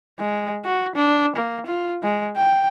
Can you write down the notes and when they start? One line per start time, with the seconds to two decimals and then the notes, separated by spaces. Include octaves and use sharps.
0.19 G#3
0.65 F#4
0.95 D4
1.36 A#3
1.66 F4
2.03 G#3
2.36 G5